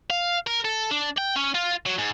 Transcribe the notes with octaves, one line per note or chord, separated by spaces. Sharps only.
F5
A#4
A4
D4
G5
C#4
F4
F#3
G#2